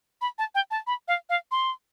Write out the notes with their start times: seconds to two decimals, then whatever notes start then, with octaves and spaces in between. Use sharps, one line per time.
0.21 B5
0.38 A5
0.55 G5
0.71 A5
0.87 B5
1.08 F5
1.29 F5
1.51 C6